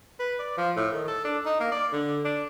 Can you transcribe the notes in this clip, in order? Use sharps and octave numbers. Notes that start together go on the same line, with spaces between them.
B4
D5
F3
A2
D#3
A4
D4
D#4
A#3
D5
D3
D4